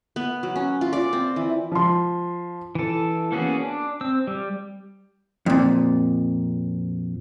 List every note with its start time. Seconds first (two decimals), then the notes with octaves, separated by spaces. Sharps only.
0.16 B3
0.43 F#3
0.56 C#4
0.81 F4
0.93 D5
1.13 C4
1.36 E3
1.71 F3 C6
2.75 E3 A4
3.32 A#3 B3 C#4 F#4 G#4
3.60 D4
4.01 C4 E6
4.27 G3
5.46 F2 A#2